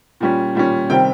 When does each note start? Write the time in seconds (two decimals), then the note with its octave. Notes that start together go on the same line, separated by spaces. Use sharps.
0.21 A#2 G3 C#4
0.55 A#2 G3 C#4
0.90 C3 D#3 G3 C4 G5